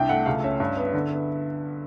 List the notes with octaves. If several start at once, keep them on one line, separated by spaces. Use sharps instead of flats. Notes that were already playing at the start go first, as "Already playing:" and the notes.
Already playing: C2 D4 G5
A3 F#5
C#2 F5
C#4 E5
G2
B3
D3
B3